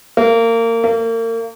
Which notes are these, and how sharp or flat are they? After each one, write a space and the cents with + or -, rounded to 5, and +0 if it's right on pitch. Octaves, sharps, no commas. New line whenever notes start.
A#3 -25
A#3 -35